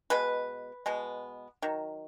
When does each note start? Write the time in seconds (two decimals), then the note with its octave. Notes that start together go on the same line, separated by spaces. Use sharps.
0.10 B2 G#3 B3 B4
0.86 B2 G#3 B3
1.62 D#3 F#3